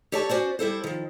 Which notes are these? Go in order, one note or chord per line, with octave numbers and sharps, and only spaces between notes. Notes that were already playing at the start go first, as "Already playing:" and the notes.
G4 A4 C#5 D5 A5
C#4 F#4 C5 D5
G3 E4 A4 C5
D#3 F3